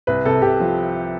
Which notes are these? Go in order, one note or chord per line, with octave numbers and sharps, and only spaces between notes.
C2 B4
C3 A4
C3 G4
F3